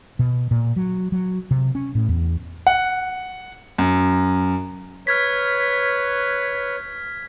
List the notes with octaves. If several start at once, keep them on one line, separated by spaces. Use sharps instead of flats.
B2
A#2
F#3
F#3
C3
C#4
A2
E2
F#5
F#2
B4 C#5 F6 G#6 B6